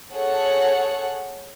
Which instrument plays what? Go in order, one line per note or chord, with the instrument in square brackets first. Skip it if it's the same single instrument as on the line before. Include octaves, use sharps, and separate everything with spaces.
[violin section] G#4 A4 C#5 F#5